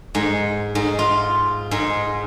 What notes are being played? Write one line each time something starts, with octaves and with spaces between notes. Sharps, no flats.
G#2
G#2
F4
G#2